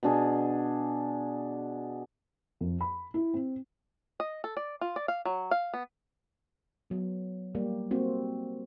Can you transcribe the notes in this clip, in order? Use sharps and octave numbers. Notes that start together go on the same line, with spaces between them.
B2 D4 G#4
F2
B5
E4
C4
D#5
A4
D5
F4
D5
F5
F#3
F5
B3
F#3 B3
G3 A#3 G4
A#3 C4 F#4